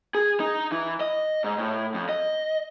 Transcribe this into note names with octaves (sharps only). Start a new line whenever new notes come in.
G#4
D#4
E3
D#5
G#2
A2
F2
D#5